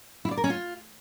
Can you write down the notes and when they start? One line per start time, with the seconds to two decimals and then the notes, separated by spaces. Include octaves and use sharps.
0.25 E4
0.31 D5
0.37 A#4
0.44 C#4
0.50 F4